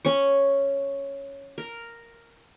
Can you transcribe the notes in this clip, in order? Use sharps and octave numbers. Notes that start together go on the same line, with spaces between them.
C#4 C#5 C#6
A#4